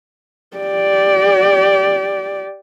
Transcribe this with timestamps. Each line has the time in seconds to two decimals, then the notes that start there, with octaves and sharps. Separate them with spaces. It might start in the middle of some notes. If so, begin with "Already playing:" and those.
0.57 G4 D5